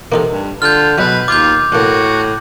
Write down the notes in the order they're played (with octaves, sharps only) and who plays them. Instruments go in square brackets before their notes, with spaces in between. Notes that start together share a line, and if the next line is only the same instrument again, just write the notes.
[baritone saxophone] C3 [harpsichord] A#3 D#4 A4
[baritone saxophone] G2
[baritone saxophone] D3 [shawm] F4 [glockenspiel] F6 G6
[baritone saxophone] B2 [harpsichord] F#3 G#3 [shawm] B4
[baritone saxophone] D#2 [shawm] F4 [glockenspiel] D6 G6
[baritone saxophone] A2 [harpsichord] A#3 C#4 [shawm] F#4